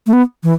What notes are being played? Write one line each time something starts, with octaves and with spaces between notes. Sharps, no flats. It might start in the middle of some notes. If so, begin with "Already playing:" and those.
A3
B3
E3